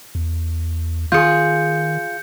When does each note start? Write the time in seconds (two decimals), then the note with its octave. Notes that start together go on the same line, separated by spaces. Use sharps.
0.15 E2
1.12 D#3 F4 G#4 G6 C#7